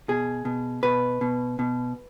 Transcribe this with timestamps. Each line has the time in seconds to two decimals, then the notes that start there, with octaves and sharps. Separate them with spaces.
0.08 B2 G#4
0.45 B2
0.83 B2 B4
1.21 B2
1.59 B2